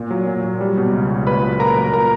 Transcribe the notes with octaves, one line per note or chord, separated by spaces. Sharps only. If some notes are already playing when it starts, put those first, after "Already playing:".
Already playing: A#2
F#3
A#2
F#3
G3
B2
C#2
C#2
A#2 B4 B5
F#3
A#2 A#4 A#5
F#3
A#2 A#4 A#5